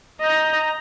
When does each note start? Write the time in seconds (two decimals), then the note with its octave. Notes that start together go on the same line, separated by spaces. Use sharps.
0.21 D#5 A#5 G6